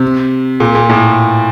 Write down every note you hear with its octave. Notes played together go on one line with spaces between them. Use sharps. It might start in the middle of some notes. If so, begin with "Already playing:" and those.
Already playing: C3
A#2
A#2
A2